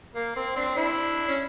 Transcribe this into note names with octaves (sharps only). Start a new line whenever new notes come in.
A#3
C4
C4 D4
D4 E4
C#4